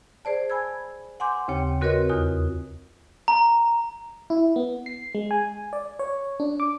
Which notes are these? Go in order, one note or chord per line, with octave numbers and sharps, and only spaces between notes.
G#4 C5 D5 A5
G#5 B5 E6 G#6
F#5 G#5 C6 D6 G6
D#2 C#3 C4 G4 C#5 G5
C4 F#4 A#4 B4 C#5 D#5
E2 F4 D#6 F#6
A#5
E4
B3
C7
G#3
G#5
D5
C#5
D4
D6